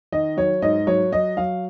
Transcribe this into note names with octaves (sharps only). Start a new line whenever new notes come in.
D#3 D#5
F#3 C#5
G#2 D#5
F#3 C#5
F#3 D#5
F#3 F5